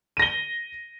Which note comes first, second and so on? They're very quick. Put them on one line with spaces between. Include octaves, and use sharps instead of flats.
D#7 A#6 G7